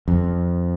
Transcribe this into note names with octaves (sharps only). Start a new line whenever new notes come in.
F2